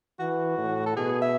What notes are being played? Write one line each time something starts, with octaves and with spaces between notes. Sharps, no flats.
E3 F#4
A2
A4
B2 G#4
E5